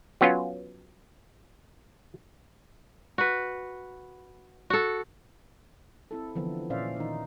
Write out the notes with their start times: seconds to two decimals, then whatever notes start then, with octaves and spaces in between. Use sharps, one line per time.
0.21 F#3 B3 C#4 F4
3.18 F#4 B4
4.70 F#4 A4
6.11 C4 E4 A4
6.35 D3 E3 F3 B3
6.70 A#2 C#4 C5 D5 E5 F5
6.97 D#3 D#4